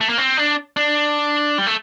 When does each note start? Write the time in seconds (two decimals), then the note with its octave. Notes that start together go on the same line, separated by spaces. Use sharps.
0.01 A3
0.09 A#3
0.18 C4
0.37 D4
0.77 D4
1.58 G3
1.67 A3